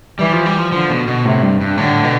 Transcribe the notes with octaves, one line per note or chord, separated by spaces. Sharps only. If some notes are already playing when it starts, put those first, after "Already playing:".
E3 G3
F3
G3
F3
D3 F3
B2
B2
A2 C3
G2
G2
A2 D3
B2